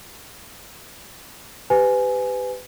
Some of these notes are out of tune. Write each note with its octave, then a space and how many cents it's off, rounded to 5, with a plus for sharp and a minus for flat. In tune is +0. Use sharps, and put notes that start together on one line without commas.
G4 +0 B4 +25 G#5 +10